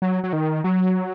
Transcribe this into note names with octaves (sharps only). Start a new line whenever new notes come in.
F#3
F#3
D#3
F#3